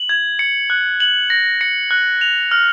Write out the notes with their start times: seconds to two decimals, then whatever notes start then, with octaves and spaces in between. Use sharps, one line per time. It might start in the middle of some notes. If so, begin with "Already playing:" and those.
Already playing: F#7
0.09 G#6
0.39 C#7
0.70 F#6
1.00 F#7
1.30 A#6
1.61 C#7
1.91 F#6
2.21 F7
2.51 F6